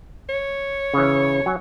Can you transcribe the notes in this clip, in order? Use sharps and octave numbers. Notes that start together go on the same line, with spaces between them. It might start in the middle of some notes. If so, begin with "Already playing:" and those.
C#5
C#3 E3
F#3 G#5